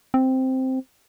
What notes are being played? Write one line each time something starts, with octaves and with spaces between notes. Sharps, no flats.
C4